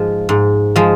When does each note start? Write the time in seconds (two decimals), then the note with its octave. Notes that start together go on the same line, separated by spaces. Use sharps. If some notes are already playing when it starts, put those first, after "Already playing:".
Already playing: G#2 F3 G#3
0.29 G#2
0.76 F3 G#3